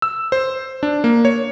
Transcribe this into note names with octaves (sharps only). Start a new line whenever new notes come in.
E6
C5
D4
A#3
C#5